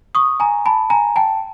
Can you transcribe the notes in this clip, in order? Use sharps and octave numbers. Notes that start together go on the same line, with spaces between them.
C#6 D#6
G#5 A#5
A5 B5
G#5 A#5
G5 A5